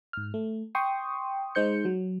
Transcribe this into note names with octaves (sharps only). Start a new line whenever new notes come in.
G#2 F6
A3
G5 C6 C#6 D#6
G#3 D#4 C5 G6 C#7
F#3